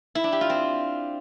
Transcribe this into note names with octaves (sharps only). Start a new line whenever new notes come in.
E4
D4
G4
F4
C4